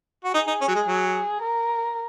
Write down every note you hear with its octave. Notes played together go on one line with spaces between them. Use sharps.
F#4
D#4 G#4
D#4
C#4
F#3
G#3
F#3
A#4